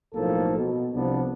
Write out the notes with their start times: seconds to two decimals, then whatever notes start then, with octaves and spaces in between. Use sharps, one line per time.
0.14 B1 A2 F3 A#3 A4
0.57 B2
0.94 C2 C3 F3 B3 D4